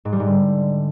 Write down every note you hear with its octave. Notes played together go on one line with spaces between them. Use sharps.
G#2
G3
G#2
D3